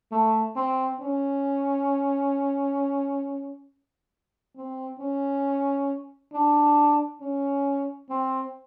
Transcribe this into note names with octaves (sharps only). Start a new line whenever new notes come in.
A3
C4
C#4
C4
C#4
D4
C#4
C4